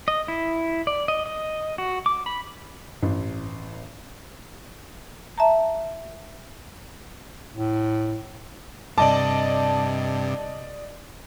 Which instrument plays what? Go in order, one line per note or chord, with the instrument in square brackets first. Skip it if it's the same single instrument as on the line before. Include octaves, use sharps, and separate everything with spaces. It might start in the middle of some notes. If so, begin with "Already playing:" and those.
[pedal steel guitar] D#5
E4
D5
D#5
D#5
F#4
D6
B5
[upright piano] A1 [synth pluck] G2
[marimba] E5 A5 A#5
[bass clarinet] A2
[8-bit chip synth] G2 C3 [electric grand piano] D5 D#5 D6 [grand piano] A5